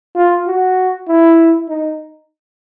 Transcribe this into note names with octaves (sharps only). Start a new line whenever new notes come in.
F4
F#4
E4
D#4